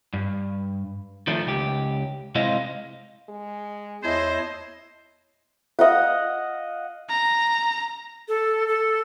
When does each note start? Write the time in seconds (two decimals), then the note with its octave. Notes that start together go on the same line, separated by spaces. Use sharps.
0.13 G2
1.27 D#3 F3 A3 D4
1.47 C#2 G4
2.35 C3 G#3 E4 C5 D#5 F5
3.29 G#3
4.03 E2 E4 C5 C#5 D#5 A5
5.79 D#5 F5 F#5
7.09 A#5
8.28 A4
8.68 A4